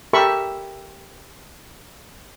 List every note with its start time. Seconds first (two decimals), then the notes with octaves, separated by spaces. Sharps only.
0.13 G4 A4 A#4 E5 B5 C#6